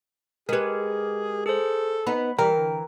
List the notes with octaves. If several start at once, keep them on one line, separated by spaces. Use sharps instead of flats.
G#3 G4 G#4 A#4 B4
G#4 A4 C5
B3 D#4 B5
E3 G3 A#4 G5
D3